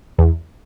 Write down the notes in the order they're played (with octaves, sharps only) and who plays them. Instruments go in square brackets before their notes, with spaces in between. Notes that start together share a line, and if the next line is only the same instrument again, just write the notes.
[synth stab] E2